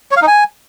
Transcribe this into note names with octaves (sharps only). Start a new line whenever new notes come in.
C#5
F5
D#4
G#5